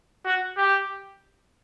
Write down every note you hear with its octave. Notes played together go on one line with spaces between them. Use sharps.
F#4
G4